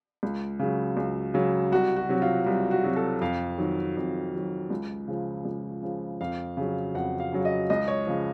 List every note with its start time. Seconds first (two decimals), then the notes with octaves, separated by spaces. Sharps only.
0.23 C#2
0.59 C#3 F#3
0.97 C#2
1.34 C#3 F#3
1.72 C2 F#4
1.96 F#4
2.09 C3 F#3
2.22 F4
2.46 C2
2.71 F#4
2.84 C3 F#3
2.96 A4
3.21 F2 F5
3.58 D#3 F#3
3.97 F2
4.34 D#3 F#3
4.70 C#2
5.08 C#3 F3
5.45 C#2
5.82 C#3 F3
6.21 F2 F5
6.57 C#3 F#3
6.94 F2 F#5
7.20 F5
7.32 C#3 F#3
7.45 D#5
7.70 C#2 D#5
7.88 C#5
8.07 C#3 F3